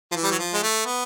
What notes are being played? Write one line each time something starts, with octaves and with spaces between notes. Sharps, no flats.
F3
E3
G3
F#3
F3
G#3
A3
B3